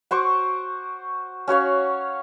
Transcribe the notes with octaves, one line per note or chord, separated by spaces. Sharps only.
F#4 C5 C#6 D6
C#4 F#4 C#5 F5